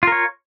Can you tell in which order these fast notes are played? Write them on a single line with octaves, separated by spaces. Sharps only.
F4 A#4 C#5